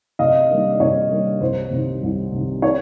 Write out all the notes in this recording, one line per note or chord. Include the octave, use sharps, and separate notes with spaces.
C3 D#5 F5
D#3 G3 A#3 D4
D5
C3 C#5
D#3 G3 A#3 D4
C2 C5
C3 D#3
C2
C3 D#3
C#5